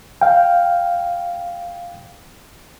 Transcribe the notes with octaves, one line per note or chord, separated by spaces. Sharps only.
F5 G5